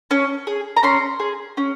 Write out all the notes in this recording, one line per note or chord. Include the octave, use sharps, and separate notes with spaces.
C#4
G#4
A#5
C#4 C6
G#4
C#4